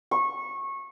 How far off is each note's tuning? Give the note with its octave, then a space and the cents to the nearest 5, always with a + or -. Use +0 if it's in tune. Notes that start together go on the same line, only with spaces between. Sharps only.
C#6 -20